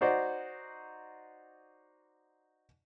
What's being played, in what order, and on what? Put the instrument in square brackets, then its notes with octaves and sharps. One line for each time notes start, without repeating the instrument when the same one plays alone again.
[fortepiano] D#4 F#4 C5 D5